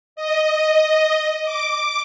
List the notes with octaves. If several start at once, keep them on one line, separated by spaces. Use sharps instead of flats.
D#5
D6